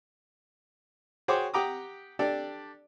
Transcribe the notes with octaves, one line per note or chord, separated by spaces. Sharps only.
F#4 G#4 C5 C#5 G5 D6
G4 F#5 G5 A#5 D6 D#6
D4 G4 A4 D5